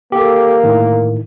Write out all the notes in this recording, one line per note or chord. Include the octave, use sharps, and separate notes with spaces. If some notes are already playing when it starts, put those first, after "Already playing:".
A#3 G4 A4
A2 D#3